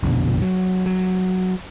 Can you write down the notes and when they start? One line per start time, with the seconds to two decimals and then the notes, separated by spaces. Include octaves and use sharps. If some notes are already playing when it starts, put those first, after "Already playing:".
0.03 A#1 F2 B2 D3
0.42 F#3
0.86 F#3